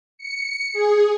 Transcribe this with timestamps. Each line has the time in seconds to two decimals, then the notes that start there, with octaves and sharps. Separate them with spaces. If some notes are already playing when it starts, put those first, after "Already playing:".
0.18 C#7
0.73 G#4